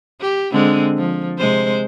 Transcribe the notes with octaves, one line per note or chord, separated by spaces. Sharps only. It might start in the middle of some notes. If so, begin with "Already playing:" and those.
G4
D3 G#3 C4
F3
C3 G#3 C5